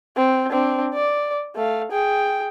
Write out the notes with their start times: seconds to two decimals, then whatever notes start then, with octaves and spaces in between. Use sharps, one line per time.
0.17 C4
0.50 C4 D4
0.94 D5
1.56 A3 F5
1.92 G#4 G5